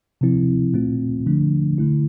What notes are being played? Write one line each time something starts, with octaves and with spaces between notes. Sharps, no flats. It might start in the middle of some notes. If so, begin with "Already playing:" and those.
C3 F3 C4 E4
A#2 A3 C4 F4
D3 F3 A3 D4
D3 A3 E4